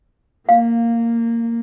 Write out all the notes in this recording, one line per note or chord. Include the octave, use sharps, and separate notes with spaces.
A#3 F5